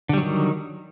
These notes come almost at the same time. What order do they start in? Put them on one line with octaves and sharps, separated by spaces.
D3 G3 F#3 D#3